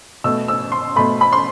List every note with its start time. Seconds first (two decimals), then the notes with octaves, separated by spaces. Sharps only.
0.24 B2 A3 E6
0.48 E6
0.72 C6
0.96 B2 A3 B5
1.21 B5
1.33 C6